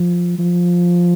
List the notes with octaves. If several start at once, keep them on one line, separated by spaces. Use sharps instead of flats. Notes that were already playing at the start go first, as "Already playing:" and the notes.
Already playing: F3
F3